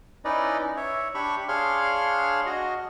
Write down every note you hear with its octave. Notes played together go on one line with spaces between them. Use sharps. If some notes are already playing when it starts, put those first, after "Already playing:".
C#4 D#4 E4 B4 D5 D#5
C#5 E5
D4 G4 B5 C#6
D4 G#4 C#5 F5 C6 F6
F#4 D#5